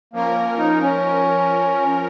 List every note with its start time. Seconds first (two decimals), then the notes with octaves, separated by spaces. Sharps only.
0.13 F3 A#3 C#4 A#4
0.58 D#4
0.81 C#4